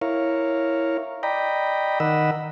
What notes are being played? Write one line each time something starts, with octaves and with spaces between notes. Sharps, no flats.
E4 A#4 C#5 F5
D5 D#5 G5 A#5 B5
D#3 A#4 D#5 F#5 B5 E6